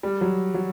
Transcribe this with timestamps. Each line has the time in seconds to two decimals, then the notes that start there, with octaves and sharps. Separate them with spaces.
0.03 G3
0.21 F#3
0.54 F#3